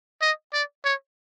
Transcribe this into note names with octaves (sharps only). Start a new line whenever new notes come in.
D#5
D5
C#5